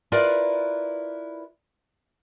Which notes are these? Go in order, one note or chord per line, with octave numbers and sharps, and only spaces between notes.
E4 F4 A#4 B4 D5